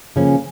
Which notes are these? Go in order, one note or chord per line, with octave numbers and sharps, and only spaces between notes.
C#3 F3 A#3 C#4